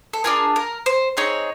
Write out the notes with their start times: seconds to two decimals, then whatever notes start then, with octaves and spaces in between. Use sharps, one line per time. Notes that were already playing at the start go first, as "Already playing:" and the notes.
0.13 A4
0.24 D4 F4 G#4 A#4
0.56 A#4
0.86 C5
1.17 C4 D#4 G#4 C#5